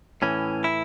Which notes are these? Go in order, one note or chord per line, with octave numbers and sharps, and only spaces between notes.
A2 E3 C#4
E4